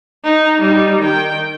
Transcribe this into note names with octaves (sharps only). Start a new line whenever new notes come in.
D#4
G3 D#4
D#3 G5